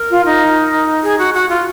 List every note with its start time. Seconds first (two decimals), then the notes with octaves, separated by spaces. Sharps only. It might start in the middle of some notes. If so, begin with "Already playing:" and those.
Already playing: A#4
0.10 F4
0.25 D#4
1.03 G#4
1.19 F#4
1.34 F#4
1.49 F4